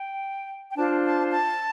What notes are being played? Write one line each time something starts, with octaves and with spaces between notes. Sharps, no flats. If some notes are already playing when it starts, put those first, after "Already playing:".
Already playing: G5
G5
D4 F4 C5 A5
A5
A5